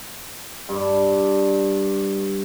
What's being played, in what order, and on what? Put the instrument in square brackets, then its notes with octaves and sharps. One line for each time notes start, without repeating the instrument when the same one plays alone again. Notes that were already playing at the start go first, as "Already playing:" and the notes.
[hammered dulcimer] G2 D5